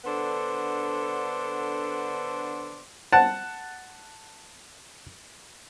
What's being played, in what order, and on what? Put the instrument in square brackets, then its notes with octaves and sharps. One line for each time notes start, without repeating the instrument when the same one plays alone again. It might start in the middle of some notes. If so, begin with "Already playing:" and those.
[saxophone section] D3 B3 D4 A4 C5
[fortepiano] F#5 A5